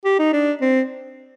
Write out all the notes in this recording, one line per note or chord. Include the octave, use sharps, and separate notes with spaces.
G4
D#4
D4
C4